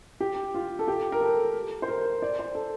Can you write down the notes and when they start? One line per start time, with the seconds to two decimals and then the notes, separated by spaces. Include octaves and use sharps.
0.20 G4
0.54 F4
0.79 A4
0.88 G4
1.12 A#4
1.21 A4
1.82 C5
1.88 A#4
2.22 D5
2.39 C5
2.55 A4